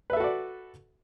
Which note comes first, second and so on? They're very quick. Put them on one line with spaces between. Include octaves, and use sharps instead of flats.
B4 E5 A4 F#4 D5